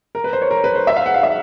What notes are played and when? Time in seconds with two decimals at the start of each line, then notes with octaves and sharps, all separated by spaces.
0.15 A#4
0.24 B4
0.33 C5
0.42 C#5
0.51 A#4
0.64 B4
0.75 C5
0.87 E5
0.96 F5
1.06 F#5
1.14 F5
1.23 E5